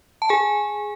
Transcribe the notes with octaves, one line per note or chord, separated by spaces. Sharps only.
A5
G#4 G#5